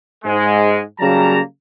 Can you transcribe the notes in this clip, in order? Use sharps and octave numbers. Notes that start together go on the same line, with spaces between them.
G#2 G#3
C#3 F#3 G3 A#3 A5 A#5